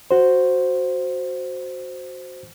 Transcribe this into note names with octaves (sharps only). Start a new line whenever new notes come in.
F#4 C5